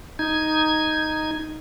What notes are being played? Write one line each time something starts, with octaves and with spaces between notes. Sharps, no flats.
D#4 G#6